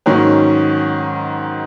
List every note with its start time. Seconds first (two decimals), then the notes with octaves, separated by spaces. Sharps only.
0.06 G#2 D#3 F#3 C#4